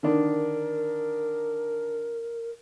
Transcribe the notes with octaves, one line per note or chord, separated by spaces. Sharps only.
D3 D#3 D4 A#4